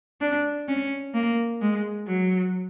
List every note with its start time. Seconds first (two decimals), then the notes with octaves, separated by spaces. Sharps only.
0.21 D4
0.68 C#4
1.14 A#3
1.62 G#3
2.07 F#3